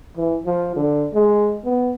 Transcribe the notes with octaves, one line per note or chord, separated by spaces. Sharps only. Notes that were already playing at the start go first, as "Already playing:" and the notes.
E3
F3
D3
G#3
B3